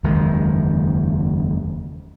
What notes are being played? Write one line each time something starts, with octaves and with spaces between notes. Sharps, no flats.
F#1 E2 D#3 G#3